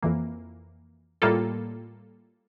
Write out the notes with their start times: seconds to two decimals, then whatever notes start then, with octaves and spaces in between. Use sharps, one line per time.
0.02 F2 E3 A#3
1.22 A2 G3 A#3 F4 A4